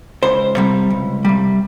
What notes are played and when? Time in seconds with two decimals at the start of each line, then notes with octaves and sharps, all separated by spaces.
0.23 C#2 C5
0.57 C3 G3
0.90 C#2
1.25 C3 G3